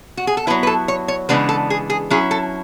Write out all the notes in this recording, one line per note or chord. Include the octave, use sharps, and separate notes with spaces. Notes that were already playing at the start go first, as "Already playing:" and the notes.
F#4
G#4
A4
F#3 B3 E4 B4
B4
A4
C#5
C#5
C#3 E3 G#3 B3 D4 B4
A4
G#4
G#4
F#3 C#4 E4 G#4
A4